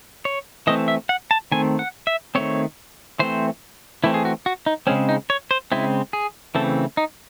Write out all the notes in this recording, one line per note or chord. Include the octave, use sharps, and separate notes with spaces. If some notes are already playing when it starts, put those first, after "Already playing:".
C#5
E3 A3 C4 D#5
E5
F#5
A5
D#3 A3 C4 G#5
F#5
E5
D#3 A3 C4 C#5
E3 A3 C4 C5
E3 A3 C4 E4
G#4
F#4
F#4
D#4
C#3 G#3 C4 C#4
D#4
C#5
C5
C#3 G#3 C4 E4
G#4
C#3 E3 A3 C4 A4
D#4